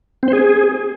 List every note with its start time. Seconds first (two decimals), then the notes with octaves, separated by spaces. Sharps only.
0.23 C4
0.28 C5
0.33 G#4